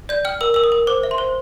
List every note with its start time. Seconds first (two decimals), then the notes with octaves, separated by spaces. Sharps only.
0.09 D5 G6
0.25 G5 F6
0.41 A#4 E6
0.54 A#4 E6
0.64 D#6
0.72 A#4
0.87 C5 D6
1.03 E5
1.11 C6
1.18 C5